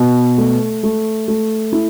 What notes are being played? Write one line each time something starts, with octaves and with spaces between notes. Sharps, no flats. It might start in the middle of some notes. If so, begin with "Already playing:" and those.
Already playing: B2
A3
A3
A3
E4